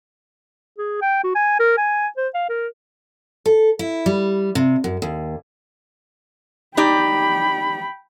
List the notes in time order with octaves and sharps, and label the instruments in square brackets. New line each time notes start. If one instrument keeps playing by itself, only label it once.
[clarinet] G#4
G5
F#4
G#5
A#4
G#5
C5
F5
A#4
[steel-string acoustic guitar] A4
E4
G3
C3
F#2
D#2
[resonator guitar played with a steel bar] D#4 G4 D5 [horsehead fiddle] G5 B5